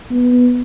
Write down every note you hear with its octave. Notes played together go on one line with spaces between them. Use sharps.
B3